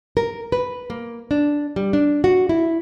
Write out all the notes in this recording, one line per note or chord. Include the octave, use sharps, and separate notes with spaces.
A#4
B4
A#3
D4
G3
D4
F#4
E4